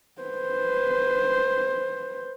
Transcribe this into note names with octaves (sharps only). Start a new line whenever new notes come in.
B4 C5